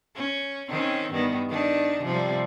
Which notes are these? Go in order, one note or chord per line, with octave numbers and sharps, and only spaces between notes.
C#4
D#3 C4 C#4
G2 D#3 B3
D#3 D4 D#4
C3 F3 G3